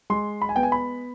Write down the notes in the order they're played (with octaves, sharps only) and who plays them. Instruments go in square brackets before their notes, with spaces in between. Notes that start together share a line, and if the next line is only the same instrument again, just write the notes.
[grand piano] G#3 C6
B5
G#5
B3 G5
G#5
B5